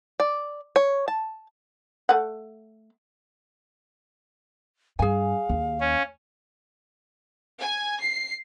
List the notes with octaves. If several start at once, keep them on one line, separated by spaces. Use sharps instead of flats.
D5
C#5
A5
A3 F#5
G2 G#4 F5 G#5
D#2
C#4
G#5
C7